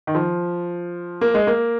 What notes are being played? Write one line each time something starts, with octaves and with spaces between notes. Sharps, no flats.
D#3
F3
A#3
G#3
A#3